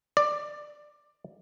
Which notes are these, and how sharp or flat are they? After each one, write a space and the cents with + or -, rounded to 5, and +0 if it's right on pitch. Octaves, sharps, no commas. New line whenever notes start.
D5 +15